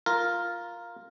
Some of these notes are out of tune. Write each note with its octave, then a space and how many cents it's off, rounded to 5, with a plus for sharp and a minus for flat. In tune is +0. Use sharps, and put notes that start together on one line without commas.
F4 +0 A#4 +0